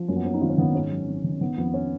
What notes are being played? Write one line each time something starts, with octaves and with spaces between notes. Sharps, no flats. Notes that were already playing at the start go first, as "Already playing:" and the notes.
Already playing: F3
F#2 A#3
B3
F#3 C#4
D#4
G#1 F4
C#4
D#3 B3
G#2 C#4
F#3
G#1
D#3
D#3 B3
F2 B3
C#4